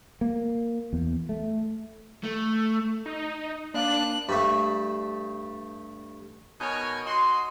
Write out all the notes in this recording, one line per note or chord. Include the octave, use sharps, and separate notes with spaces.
A#3
E2
A3
A3
D#4
A#3 D4 F5 F#6
G2 A3
B2 D#4 A#4 C#5 G#5
F#4 D#5 C6